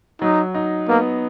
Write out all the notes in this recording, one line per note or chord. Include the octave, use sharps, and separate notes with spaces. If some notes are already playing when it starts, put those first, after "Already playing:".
F#3 D#4
D#4
A#3 B3